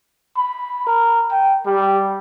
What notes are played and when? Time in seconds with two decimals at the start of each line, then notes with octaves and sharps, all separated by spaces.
0.37 B5
0.87 A#4
1.31 G5
1.66 G3